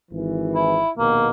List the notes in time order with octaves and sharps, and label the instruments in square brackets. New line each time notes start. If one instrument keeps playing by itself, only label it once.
[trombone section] G#1 E3
[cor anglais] E4
[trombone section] A#1 D#2 B2 [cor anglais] A#3